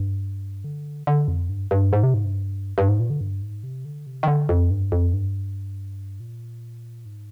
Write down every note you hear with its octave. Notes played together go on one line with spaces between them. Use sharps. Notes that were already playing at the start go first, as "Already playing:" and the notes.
Already playing: G2
D3
D3
F2
G2
G2
G#2
C3
G#2
G2
G2
G#2
A#2
D3
G2
G#2
C3
D3
C3
D#3
D3
F2
G2
F2
G2
A#2
G#2